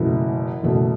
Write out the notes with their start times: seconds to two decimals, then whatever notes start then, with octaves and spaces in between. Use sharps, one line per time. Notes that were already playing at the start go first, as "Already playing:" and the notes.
Already playing: F#1 E2 B2 A3 E4
0.63 F#1 E2 B2 A3